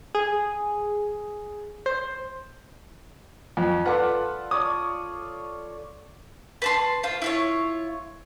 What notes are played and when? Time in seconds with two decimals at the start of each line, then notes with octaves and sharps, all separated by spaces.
0.15 G#4
1.86 C5
3.57 F2
3.86 F4 A4 B4 D5 F#5
4.51 C#5 D5 D#6
6.62 B4 A5 C6
7.03 F4 C5
7.22 E4 F4 C#5